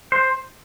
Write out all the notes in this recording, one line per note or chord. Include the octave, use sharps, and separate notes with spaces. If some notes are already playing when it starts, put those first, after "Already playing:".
C5